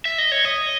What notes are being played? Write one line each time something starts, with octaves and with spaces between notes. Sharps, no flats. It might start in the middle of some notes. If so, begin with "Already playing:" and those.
E5
D#5
C#5
D#5